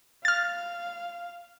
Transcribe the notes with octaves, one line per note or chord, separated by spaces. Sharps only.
F5 F6 A6